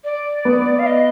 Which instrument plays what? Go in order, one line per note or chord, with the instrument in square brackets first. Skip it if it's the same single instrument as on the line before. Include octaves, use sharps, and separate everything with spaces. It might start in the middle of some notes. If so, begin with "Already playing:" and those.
[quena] D5
[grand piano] B3
[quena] F5
D#5